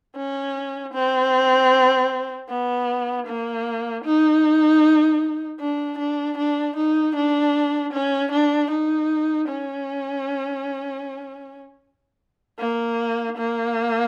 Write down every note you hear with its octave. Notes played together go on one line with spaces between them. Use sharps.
C#4
C4
B3
A#3
D#4
D4
D4
D4
D#4
D4
C#4
D4
D#4
C#4
A#3
A#3